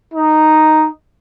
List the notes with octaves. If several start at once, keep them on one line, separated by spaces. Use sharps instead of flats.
D#4